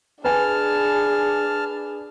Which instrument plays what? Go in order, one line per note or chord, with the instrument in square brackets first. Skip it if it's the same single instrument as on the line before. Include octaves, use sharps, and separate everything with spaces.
[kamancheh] D4 G#4 [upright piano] B4 G#5 [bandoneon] A5 F6